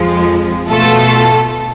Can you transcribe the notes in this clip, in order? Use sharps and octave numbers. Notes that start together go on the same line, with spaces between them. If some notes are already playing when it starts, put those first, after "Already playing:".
Already playing: F2 F3 G#3
B2 A3 F4 A4